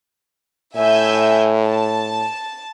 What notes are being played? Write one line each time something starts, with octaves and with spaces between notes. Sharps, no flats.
A2 E5 G#5 G6
A5